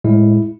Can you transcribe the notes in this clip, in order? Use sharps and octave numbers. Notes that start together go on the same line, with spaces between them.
A2 G#3 E4